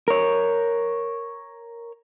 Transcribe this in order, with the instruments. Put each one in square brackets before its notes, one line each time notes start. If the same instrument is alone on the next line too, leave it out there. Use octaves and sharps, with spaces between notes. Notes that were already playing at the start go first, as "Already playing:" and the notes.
[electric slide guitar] A#4 C#5